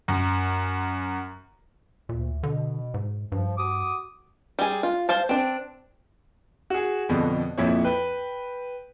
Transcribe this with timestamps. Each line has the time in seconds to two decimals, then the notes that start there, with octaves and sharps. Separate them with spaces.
0.08 F#2
2.09 D2 A#2
2.43 B2 D3
2.94 G#2
3.32 G2 F3
3.58 F#4 D6 D#6
4.59 G3 G#4
4.83 F4
5.09 C5 F5 A5
5.29 C4 D4
6.70 F#4 G#4
7.09 F2 B2 D3
7.58 F2 A#2 E4 C#5
7.84 B4 G5